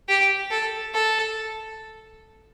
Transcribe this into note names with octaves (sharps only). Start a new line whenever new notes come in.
G4
A4
A4